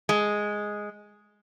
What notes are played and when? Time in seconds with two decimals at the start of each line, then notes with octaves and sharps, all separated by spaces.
0.09 G#3